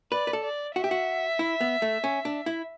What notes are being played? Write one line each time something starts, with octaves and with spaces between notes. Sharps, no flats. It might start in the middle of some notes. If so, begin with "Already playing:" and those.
B4 D5
B4
A4
D5
F#4 E5
G4
F#4
E4
B3
A3
C#4
D4
E4